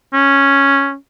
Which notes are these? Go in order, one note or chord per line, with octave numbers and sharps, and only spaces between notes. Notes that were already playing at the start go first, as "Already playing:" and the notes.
C#4